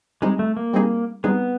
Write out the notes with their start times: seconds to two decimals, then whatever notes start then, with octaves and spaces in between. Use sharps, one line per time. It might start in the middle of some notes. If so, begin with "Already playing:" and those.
0.22 G3 G#3 C4 D#4 G#4
0.39 A3
0.57 A#3
0.73 G3 C4 D#4 G#4
1.24 G3 B3 C4 D#4 G#4